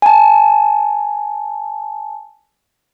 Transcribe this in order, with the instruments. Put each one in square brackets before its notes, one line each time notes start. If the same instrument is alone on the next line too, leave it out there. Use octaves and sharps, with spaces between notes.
[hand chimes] G#5 A5